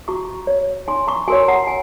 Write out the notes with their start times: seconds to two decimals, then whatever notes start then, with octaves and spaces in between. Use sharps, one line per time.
0.08 F#4 A#5 C#6
0.47 C#5
0.88 D#4 G#5 C6
1.07 A#5 C#6
1.28 F#4 A#4 C#5 G#5 C6
1.48 F#5 A#5
1.67 G#5